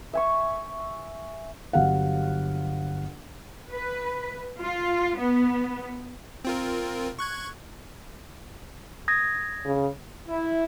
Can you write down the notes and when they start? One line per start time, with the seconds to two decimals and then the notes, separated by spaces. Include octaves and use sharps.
0.13 E5 G#5 C#6
1.73 G1 F#3 G4 F5 F#5
3.71 B4
4.62 F4
5.19 B3
6.45 C4 F4 A#4
7.19 C#6 F#6 G#6
9.08 D#6 G#6 A#6
9.65 C#3
10.28 E4